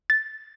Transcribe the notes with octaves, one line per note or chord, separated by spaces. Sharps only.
A6